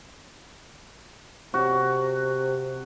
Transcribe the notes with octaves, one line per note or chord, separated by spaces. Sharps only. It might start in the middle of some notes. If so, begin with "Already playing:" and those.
C3 F#4